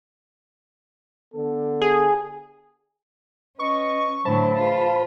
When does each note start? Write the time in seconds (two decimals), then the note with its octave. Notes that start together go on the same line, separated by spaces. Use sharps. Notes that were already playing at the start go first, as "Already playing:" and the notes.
1.34 D3 B3 A4
1.81 G#4
3.59 C#4 B4 D#5 C#6
4.25 A2 D3 E3 F#3 C5 A5 B5
4.59 G#2 E3 F4